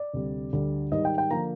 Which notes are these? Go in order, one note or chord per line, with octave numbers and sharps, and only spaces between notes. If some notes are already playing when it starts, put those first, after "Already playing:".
Already playing: D5
D2 C3 G3
D2 D3 G3
G#2 D#3 G3 D#5
G5
G5
D3 F3 A#3 A#5